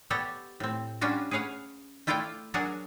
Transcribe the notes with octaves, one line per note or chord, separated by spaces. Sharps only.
B3 G4 A4 C#5 D5 F#5
A2 C4
G3 C#4 D4 F4 F#4
G#4 B4 C#5 F5 F#5
A3 E4 F4 A4 D5 G5
F#3 D4 G#4 A#4 F#5 G#5